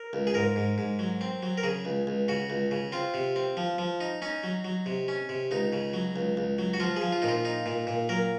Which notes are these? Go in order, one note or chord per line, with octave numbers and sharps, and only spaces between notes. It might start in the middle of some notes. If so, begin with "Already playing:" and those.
Already playing: A#4
C#2
G#4
G#2 A#4
G#2
G#2
F#3
C4
F#3
A#4
C#3 G#4
C#2
C#2
C#3 F#4
C#2
C#3
C4 F4
C3
C4
F3
F3
D#4
C#4 D#4
F#3
F#3
C3
C#4
C3
C#2 D#4
C#3
F#3
C#2
C#2
F#3
F#4
F3 F4
G#4
F3
F4
A#2 D#4
F4
D#4
A#2
A#2
F#3 A#4